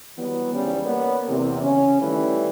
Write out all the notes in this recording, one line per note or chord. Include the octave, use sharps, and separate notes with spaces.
E3 F#3 G3 B3
E2 G#2 C#3 G3 C#4
A#3 B3 A#4 C#5 D5
E2 C3
C#3 C#4
D#3 E3 G3 A3 E4